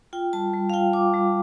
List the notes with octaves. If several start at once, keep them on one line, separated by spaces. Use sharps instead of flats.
F4 G5
G3 A5
G3
F5
F4 G5
F4 D6
G3